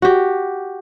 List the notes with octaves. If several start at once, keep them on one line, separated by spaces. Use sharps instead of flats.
F#4 G4